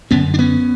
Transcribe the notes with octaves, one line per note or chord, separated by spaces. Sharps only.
F#2 D3 B3 C#4
D4
B3 C#4